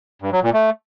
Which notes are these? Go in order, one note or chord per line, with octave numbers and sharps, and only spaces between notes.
G2
F#3
A#2
A3